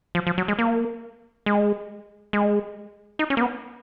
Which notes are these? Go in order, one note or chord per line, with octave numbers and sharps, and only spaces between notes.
F3
F3
F#3
G#3
A#3
G#3
G#3
D#4
C#4
A#3
B3